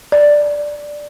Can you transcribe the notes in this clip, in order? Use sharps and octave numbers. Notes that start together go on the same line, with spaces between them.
D5